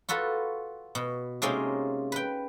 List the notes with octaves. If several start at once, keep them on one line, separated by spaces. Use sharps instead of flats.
F4 F#4 A4 B4
B2
C3 G#3 A#3 C#4 D#4 F4
B4 G5